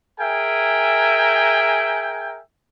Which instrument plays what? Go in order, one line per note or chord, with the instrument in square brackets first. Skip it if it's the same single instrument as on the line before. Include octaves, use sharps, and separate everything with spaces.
[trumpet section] G#4 A#4 E5 G5 G#5